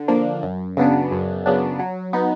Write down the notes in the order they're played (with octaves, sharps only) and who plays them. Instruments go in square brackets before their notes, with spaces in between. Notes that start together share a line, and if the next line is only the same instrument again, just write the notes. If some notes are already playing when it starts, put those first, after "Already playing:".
Already playing: [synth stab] D3
F3 A#3 D4
F#2
C#3 F#3 B3 D4
F#2
C#3 F#3 B3 D4
F#3
B3 D#4